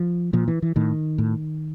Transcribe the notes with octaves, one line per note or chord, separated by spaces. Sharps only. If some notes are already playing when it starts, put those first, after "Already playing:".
Already playing: F3
A#2 F3
E3
E3
A2 D#3
A2